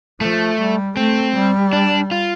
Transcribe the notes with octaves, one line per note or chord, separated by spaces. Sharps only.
F3 A3
G3
A3 C4
G3
D4
F4